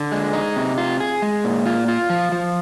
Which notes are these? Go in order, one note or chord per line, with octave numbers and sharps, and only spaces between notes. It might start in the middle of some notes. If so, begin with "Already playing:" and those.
Already playing: D3
G#3
D#4
C3
F4
G#4
G#3
A#2
F4
F4
F3
F3